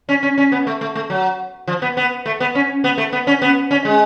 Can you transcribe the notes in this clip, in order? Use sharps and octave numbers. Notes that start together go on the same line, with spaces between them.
C#4
C#4
C#4
B3
A3
A3
A3
F#3
F3
B3
B3
A3
B3
C#4
B3
A3
B3
C#4
B3
C#4
G#3